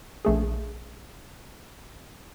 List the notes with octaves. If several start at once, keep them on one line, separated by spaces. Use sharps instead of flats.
A#1 A3 G#4